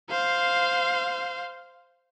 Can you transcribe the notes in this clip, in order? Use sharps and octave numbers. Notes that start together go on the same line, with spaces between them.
C5 F5